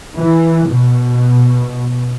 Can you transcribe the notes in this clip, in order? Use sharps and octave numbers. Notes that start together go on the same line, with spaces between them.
E3
B2